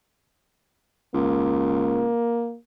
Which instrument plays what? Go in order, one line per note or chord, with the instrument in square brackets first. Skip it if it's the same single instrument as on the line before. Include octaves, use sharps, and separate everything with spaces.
[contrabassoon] C#2 [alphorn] A#3